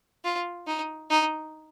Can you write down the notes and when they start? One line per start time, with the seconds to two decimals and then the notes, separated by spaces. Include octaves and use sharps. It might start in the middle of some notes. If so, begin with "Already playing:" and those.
0.25 F4
0.67 D#4
1.10 D#4